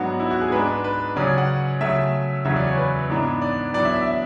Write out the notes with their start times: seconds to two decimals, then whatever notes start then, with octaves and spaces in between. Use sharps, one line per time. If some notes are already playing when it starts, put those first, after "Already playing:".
Already playing: G#2 F#3 B3 D4 F#4
0.20 E4
0.31 F#4
0.41 G#4
0.52 G#2 G#3 D4 B4
0.84 B4
1.16 C#3 F#3 C#4 D5
1.38 F#5
1.81 C#3 F#3 A3 E5
2.45 E2 C#3 F#3 C#4 E5
2.56 D5
2.67 C#5
2.78 B4
3.10 G#2 E3 B3 D4
3.42 D5
3.74 A2 F#3 B3 D4 D5
3.85 E5
3.96 E5
4.06 E5